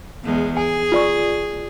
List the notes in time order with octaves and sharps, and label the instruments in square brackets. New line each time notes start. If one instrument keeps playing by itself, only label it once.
[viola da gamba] E2 G#3
[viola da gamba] G#4 [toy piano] G#5
[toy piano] F4 D5 C#6